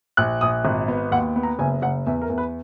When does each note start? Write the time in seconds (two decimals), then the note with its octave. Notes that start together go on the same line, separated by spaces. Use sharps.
0.17 A#1 F#6
0.41 A#1 D#6
0.65 G#1
0.88 B3
1.11 D#2 F#5
1.36 B3
1.43 A#5
1.59 F#1 G#5
1.82 F#1 F#5
2.07 E2 E5
2.22 A#4
2.29 E2
2.38 B4